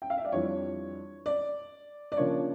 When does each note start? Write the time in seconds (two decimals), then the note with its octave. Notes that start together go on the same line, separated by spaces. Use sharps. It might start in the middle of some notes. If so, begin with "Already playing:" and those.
0.02 G5
0.10 F5
0.18 E5
0.25 D5
0.32 F2 E3 G3 D4 C#5
1.26 D5
2.12 D5
2.17 C#3 F3 A#3 D4 C#5